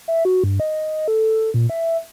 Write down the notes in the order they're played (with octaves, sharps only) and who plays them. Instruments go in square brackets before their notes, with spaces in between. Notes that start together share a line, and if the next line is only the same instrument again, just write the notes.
[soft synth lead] E5
F#4
G2
D#5
A4
A#2
E5